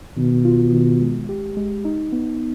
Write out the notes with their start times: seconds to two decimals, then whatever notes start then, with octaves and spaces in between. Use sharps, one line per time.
0.17 B2 D#3
0.45 F4
0.73 D#3
1.01 G#3
1.29 G4
1.57 G#3
1.85 D#4
2.12 B3